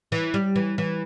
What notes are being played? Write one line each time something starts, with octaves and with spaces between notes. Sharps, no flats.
E3
G3
E3
E3